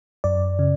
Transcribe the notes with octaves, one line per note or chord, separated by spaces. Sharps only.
F#2 D5
C#3